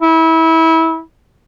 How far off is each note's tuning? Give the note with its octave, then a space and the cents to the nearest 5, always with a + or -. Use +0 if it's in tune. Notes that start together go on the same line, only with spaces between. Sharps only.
E4 -25